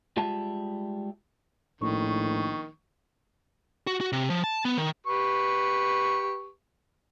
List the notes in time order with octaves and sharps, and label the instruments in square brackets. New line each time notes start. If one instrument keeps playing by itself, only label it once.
[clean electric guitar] G3 G#3 F4 G4 E5 A5
[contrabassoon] A#1 [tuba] A2 [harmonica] D#3 [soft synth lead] C#6
[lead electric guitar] F#4
F#4
C3
F3
A5
B3
D#3
[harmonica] G4 B4 C#6